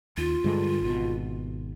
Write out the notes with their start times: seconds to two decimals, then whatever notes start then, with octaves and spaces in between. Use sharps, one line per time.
0.17 D#2 F4
0.44 G2 D3 G#3
0.81 G#1 B2